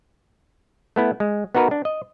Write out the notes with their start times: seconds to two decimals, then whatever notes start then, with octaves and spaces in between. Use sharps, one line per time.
0.96 A3 B3 E4
1.20 G#3
1.55 B3 D#4 F#4 A#4 B4
1.71 D4
1.85 D#5